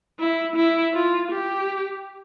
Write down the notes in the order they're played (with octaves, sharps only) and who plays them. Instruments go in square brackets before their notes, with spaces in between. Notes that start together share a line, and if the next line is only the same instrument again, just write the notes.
[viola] E4
E4
F4
G4